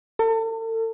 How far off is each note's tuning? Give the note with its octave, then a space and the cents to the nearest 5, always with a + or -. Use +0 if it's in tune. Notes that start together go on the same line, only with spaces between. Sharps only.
A4 +40